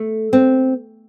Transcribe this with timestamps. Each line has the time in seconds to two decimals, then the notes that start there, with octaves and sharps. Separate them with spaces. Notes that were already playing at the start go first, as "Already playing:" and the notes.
Already playing: A3
0.33 C4